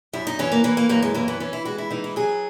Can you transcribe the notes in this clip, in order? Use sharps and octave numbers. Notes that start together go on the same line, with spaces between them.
F#2 E4
D#4
E3 C#4
A#3
E3 A#3
A#3
F#2 A#3
G#3
E3 A#3
B3
E3 C#4
E4
G#3 F#4
E4
E3 D#4
E4
F#3 G#4